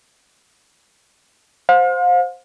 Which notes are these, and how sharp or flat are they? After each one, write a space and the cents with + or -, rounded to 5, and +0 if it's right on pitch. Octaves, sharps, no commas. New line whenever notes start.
C5 +0 F5 +40